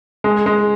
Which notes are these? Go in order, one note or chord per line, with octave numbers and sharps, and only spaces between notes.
G#3
G#3